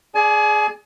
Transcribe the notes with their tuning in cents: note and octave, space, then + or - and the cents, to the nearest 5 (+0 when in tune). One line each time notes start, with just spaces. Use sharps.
G#4 +5 D5 +0 G#5 +40